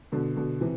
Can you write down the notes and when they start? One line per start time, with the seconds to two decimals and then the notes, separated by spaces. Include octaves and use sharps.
0.12 B2 D3
0.36 B2 D3
0.61 C3 E3